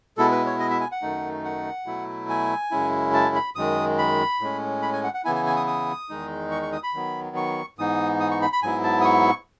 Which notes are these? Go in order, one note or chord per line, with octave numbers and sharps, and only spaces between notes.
B2 G#3 B3 E4 A4
B4
C#5
D#5
E5
G#5
F#5
F#2 D#3 A3 D#4
F#5
B2 F#3 A3 E4
G#5
F#2 C#3 G#3 C#4 E4
A5
B5
F#2 D#3 G#3 D#6
B5
A2 G#3 C#4
B5
G#5
F#5
F#5
C#3 E3 B3 E4 G#5
G#5
G#5
D#6
D#6
E2 D#3 G#3 D#4
C#6
C#6
D#6
B5
D#3 F#3 B3
C#6
G#2 E3 B3 D#4 D#6
D#6
C#6
B5
B5
G#2 F#3 B3 E4 G#5
A5
D#6
C#6